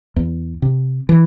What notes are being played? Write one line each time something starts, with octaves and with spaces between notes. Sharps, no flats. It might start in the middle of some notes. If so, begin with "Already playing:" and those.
E2
C3
E3